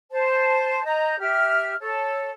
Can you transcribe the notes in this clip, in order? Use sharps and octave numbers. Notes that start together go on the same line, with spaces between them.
C5 A5
D#5 A#5 G6
G4 E5 F6
A4 C#5